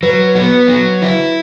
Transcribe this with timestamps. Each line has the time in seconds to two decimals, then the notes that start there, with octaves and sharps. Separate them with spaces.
0.03 F#3 B4
0.35 B3
0.68 F#3
1.02 E4